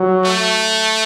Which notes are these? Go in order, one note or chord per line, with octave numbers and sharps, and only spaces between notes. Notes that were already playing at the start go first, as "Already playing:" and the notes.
Already playing: F#3
A3